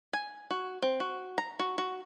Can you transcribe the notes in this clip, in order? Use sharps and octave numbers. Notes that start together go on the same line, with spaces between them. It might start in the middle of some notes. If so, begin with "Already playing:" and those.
G#5
F#4
C4
F#4
A#5
F#4
F#4